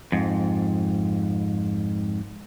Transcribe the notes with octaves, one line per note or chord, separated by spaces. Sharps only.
F2 G#2